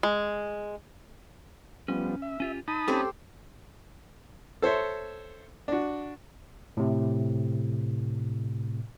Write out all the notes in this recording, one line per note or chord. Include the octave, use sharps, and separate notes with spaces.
G#3
F3 G3 B3 C#4
E5
C#4 F4 G4
D#4 A5 B5 D#6
A3 C4 C#4 G4 A4 C5
A4 C5 C#5 E5
D4 F#4
A2 C3